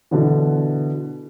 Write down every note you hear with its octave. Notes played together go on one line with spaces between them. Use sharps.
B2 D3 E3